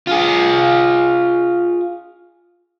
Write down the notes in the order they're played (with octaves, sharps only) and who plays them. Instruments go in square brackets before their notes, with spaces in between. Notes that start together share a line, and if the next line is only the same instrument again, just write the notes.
[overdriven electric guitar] F4 G#4